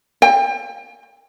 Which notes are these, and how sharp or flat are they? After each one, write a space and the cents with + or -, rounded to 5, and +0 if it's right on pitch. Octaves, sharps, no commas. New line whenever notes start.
G5 +30